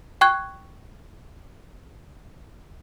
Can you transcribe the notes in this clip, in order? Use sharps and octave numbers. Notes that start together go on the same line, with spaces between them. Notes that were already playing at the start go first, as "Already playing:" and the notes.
G5 C#6 F#6 G#6